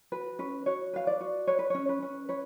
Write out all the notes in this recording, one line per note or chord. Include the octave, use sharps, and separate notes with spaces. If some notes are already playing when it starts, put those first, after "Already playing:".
F#4 B4
C#4 B4
F#4 C#5
B4 F5
D5
F#4
B4 C#5
B4
C#4 C#5
B4
C#4
B4 C#5